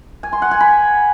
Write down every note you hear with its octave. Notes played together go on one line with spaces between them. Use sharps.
G#5
C6
F#5
G#5
B5